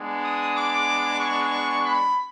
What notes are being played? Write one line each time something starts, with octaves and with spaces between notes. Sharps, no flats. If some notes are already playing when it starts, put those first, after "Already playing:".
Already playing: G#3 B3 D4
D#6
D6
C#6
B5